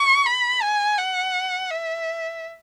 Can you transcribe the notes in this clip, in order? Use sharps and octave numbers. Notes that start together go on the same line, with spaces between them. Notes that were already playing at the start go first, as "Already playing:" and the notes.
Already playing: C#6
B5
G#5
F#5
E5